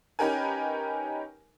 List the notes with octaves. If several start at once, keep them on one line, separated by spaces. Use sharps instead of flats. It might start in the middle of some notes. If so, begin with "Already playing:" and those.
C#4 D#4 G4 A#4 B4 G#5